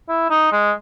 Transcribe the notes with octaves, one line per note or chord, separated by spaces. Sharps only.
E4
D#4
G#3